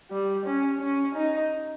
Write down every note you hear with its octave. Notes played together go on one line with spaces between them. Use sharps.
G3
C#4
C#4
D#4